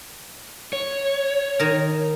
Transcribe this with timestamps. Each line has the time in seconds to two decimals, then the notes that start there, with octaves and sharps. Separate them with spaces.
0.73 C#5
1.59 D#3 A#4